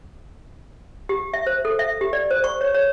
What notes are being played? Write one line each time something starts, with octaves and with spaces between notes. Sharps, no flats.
G4
E5
C5
A4
E5
G4
D5
C5
C#6
C#5
C#5